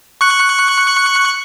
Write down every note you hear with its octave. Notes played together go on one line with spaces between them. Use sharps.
C#6 F#6 C#7